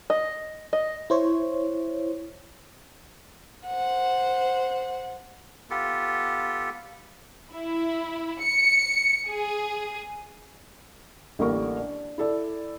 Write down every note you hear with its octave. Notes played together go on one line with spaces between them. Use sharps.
D#5
D#5
E4 C5 C#5
C5 F#5
B3 F4 G4 A4
E4
C#7
G#4
A1 D3 G3 A#3 A#4 C#6
D4
E4 A4 D5